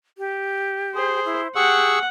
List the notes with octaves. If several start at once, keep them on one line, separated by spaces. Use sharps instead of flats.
G4
G#4 C5
E4
G4 G#4 F#5 C#6 E6